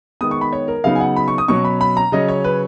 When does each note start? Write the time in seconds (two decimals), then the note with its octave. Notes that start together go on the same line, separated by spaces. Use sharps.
0.21 D#3 G#3 B3 D#6
0.31 C#6
0.41 B5
0.52 C#5
0.68 A#4
0.84 C#3 F#3 B3 D#4 F5
0.95 G#5
1.00 F#5
1.16 B5
1.28 C#6
1.38 D#6
1.48 B2 F#3 C#4 C#6
1.65 B5
1.81 B5
1.97 A#5
2.12 C#3 F#3 C#4 D#5
2.28 C#5
2.44 B4